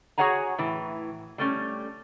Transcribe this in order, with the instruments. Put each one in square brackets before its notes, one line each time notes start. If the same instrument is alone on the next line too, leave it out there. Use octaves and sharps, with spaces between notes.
[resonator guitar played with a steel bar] F#4 G#4 C#5 F#5 G#5 A#5
A2 E3
G3 A3 C#4